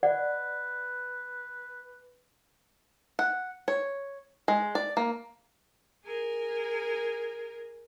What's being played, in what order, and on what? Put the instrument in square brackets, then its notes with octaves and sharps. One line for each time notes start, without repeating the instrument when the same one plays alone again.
[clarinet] B4 [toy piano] D5 D#5 F#5
[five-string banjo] F#5
C#5
G#3
D5
A#3
[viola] G#4 A#4